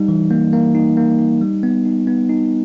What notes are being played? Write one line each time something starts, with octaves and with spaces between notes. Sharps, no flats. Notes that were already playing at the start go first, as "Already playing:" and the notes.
Already playing: G3 D#4
E3
A#3
A#3
D#4
A#3
D#4
G3
B3
D#4
B3
D#4